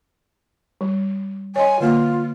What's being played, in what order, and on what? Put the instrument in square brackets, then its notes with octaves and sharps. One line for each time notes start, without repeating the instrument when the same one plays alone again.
[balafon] G3
[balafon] C#5 D#5 C6 [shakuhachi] G#5
[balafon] D3 A#3 [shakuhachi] F4